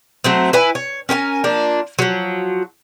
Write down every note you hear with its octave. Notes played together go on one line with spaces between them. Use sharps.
F#3 A3 C4
E4 B4 G#5
C#5
C#4 A#4 G5 G#5
F3 A#3 D4
F3 F#3